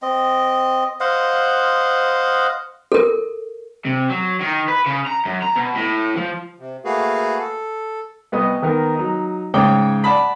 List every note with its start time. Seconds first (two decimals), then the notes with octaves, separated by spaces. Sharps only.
0.02 C4 D#5
1.00 C5 D#5 F5 F#5
2.92 A4 A#4
3.85 C3
4.10 F#3
4.41 D#3
4.68 B4
4.86 C#3
5.07 A#5
5.25 F#2
5.42 A#5
5.56 B2
5.76 A2
6.16 F3
6.59 C3
6.85 A3 A#3 F#4 G#4 B4 F5
7.39 A4
8.32 C2 B3 D#5 D#6
8.62 D#3 B3 A#4
8.95 F#3 D#4
9.54 G#2 C#3 C#5 G5 D6
10.04 D5 F#5 A5 B5